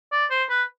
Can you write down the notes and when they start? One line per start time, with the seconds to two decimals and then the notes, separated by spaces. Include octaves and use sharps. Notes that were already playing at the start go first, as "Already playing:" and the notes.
0.12 D5
0.31 C5
0.50 B4